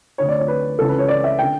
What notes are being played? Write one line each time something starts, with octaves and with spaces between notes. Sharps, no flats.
D2 D3 C#5
D5
C#5
B4
C#2 C#3 E3 A4
B4
C#5
D5
E5
D3 G5